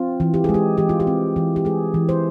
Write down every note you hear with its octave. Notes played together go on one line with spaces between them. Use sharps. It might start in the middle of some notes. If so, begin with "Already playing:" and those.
Already playing: C4 F4
E3
G4
G#3 G#4
G4
E3 G4
F4
G4
C4
E3
G4
G#3 G#4
E3
C5